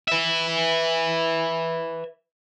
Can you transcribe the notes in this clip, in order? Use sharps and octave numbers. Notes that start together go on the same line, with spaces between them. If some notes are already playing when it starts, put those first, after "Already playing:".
B4 E5